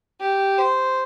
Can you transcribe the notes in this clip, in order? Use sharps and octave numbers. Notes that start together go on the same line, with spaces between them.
G4
C5